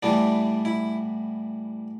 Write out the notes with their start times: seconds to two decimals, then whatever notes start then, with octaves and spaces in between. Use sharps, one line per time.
0.03 A2 E3 G3 B3 D4
0.65 E4